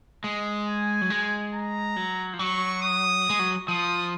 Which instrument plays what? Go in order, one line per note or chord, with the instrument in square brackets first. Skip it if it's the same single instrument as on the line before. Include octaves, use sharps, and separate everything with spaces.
[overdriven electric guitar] G#3
[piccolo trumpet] G#5
[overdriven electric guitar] F#3
G#3
[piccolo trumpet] A#5
[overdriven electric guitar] F#3
F3
[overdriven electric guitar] F#3 [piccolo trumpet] C#6
[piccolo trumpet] D#6
[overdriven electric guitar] G#3
F#3
[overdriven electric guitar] F3 [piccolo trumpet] D#6